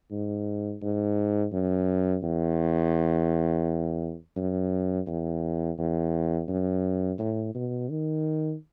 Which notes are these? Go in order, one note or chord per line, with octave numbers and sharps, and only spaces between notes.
G#2
G#2
F#2
E2
F#2
E2
E2
F#2
A2
B2
D#3